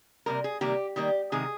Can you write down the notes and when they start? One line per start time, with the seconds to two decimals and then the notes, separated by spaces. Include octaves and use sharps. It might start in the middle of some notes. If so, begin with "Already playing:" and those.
0.26 C3 D#3 G3 A#3 A#4
0.44 G#4
0.61 C3 D#3 G3 A#3 G4
0.96 D#3 G3 A#3 G4
1.32 C3 D#3 G#3 G#4